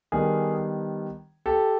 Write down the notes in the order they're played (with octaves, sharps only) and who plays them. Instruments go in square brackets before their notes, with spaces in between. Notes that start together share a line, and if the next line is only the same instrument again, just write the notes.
[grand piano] D#3 G3 B3 D4 G#4 A#4
G4 A4